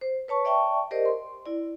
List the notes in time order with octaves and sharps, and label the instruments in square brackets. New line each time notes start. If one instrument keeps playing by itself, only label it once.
[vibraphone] C5
B4 C#5 A5 C#6
D5 E5 G5 A5 C#6
G4 A#4 C5 D5 D#5
C6
E4 D5